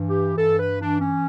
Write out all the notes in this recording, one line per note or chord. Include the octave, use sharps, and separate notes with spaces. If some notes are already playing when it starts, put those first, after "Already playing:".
Already playing: G2 E3
G4
G2 A4
B4
E3 D4
C#4